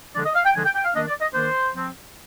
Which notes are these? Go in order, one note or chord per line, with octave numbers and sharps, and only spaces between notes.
D3 F3 G#3 D4 D5
D#5
F5
G5
D3 F3 G#3 D4 G#5
G5
G5
F5
D#3 A#3 D4 D#5
D5
D#5
D#3 A#3 D4 C5
F3 C4